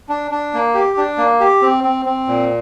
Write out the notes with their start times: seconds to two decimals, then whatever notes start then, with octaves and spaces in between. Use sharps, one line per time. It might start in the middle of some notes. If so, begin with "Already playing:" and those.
0.09 D4
0.31 D4
0.54 A#3
0.74 G4
0.97 D4
1.18 A#3
1.40 G4
1.62 C4
1.84 C4
2.06 C4
2.28 A#2